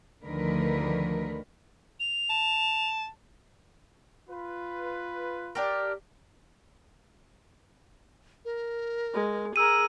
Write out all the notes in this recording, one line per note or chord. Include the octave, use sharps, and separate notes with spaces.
D2 D3 D#3 F3 A#4 B4
F7
A5
F4 B4
D4 G4 A#4
A#4
G#3
G#4 A#4 E6 D#7